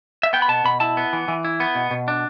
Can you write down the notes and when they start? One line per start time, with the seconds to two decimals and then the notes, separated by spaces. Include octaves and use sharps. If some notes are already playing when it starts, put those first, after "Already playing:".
0.23 E5
0.33 B3 G5
0.42 B5
0.48 B2 A5
0.64 B2 B5
0.80 E4 A5
0.97 B3
1.13 E3
1.28 E3
1.45 E4
1.60 B3
1.75 B2
1.91 B2
2.08 D4